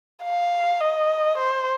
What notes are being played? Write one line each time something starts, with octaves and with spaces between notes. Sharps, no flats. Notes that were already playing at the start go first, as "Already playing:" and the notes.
F5
D#5
C5